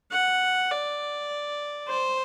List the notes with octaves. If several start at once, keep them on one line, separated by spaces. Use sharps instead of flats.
F#5
D5
C5